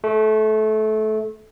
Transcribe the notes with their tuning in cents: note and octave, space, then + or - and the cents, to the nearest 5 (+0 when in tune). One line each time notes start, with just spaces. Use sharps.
A3 -25 C#6 +0